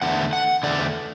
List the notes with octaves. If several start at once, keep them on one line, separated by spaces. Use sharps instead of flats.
E2 D3 A3 F#5
F#5
E2 D3 A3 D5